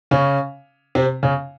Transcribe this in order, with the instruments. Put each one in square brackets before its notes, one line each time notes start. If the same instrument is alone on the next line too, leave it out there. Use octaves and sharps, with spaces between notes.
[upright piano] C#3 C#4
C3 C4
C#3 C#4